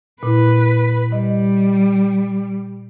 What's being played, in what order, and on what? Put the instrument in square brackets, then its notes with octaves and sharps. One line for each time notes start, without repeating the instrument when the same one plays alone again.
[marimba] A#2 E4 [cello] B4
[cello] G3 [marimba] D#5